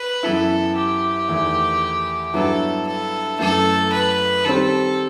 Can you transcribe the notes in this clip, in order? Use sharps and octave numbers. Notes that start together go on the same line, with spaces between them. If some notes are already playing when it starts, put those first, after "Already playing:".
Already playing: B4
F#2 E3 B3 E4 A4
G4
E2 D#3 A3 E4
G2 F#3 B3 E4 A4
A4
F#2 E3 A3 A4
B4
D#3 G3 C4 A4